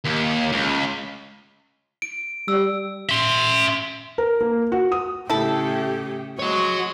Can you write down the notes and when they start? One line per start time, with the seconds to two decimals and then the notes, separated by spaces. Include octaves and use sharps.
0.05 D#2
0.53 C#2
2.02 D7
2.48 G3 E6
3.09 E5 C6
4.18 A#4
4.41 A#3
4.72 F#4
4.92 D#6
5.30 A2 C#3 A3 E4 G4 A4
6.39 G#3 F#4 C#5 C#6